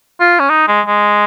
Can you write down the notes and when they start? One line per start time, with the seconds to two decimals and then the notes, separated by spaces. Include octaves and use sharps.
0.20 F4
0.40 C#4
0.50 D#4
0.68 G#3
0.86 G#3